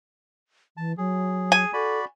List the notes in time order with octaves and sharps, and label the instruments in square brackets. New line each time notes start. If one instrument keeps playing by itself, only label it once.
[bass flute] E3 [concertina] A5
[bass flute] F#3 [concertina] G#4
[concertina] G#4 [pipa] G#5
[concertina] F#4 D5 B5 [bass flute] A4